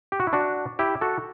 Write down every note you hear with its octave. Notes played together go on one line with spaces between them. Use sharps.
G4
F#4
E4
D4 F#4
E4 G4
F#4 A4